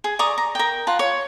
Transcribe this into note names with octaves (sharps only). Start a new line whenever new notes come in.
G#4
D5 A#5 C#6 D#6
A#5
A#4 G5
F4 F#5 A5
C#5